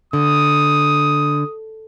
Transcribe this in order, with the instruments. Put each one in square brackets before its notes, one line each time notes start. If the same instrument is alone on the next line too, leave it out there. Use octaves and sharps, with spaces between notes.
[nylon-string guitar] D3 [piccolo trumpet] D#6